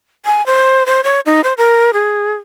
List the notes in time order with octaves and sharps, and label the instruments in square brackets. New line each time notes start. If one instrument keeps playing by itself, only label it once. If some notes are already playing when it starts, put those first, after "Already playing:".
[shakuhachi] G#5
C5
C5
C#5
D#4
C5
A#4
G#4